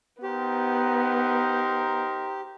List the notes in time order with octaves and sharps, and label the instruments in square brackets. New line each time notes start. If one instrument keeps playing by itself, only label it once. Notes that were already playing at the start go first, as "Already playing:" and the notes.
[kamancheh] B3 [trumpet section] D#4 A#4 C5 [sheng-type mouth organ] G4